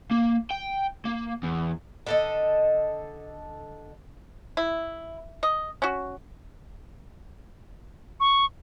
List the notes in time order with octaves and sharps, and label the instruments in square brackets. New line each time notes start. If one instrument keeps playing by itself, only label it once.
[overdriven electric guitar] A#3
G5
A#3
E2
[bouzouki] D3 A4 D#5
[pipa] E4
D#5
C#4 F#4
[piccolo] C#6